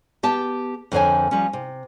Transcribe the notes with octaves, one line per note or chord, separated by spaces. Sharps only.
B3 G4 A5
F2 D3 A#4 C5 C#5 G#5
F3 G3 C#4
C3